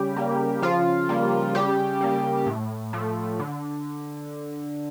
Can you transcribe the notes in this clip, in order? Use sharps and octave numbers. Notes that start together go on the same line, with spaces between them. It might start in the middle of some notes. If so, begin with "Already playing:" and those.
Already playing: C#3 G3 G4
G3 A#3
C#3 F3 F4
G3 A#3
C#3 G3 G4
G3 A#3
A2
F3 A3
D3